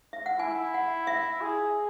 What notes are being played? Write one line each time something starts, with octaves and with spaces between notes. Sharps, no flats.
E5
F#5
E4 G#5
F#5
E5
G#4